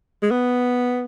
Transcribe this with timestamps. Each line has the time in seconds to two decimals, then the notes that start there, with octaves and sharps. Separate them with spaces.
0.22 G#3
0.31 B3